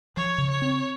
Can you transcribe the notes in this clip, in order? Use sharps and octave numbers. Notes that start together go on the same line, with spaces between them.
F3 C#5
C#3
C#5
C4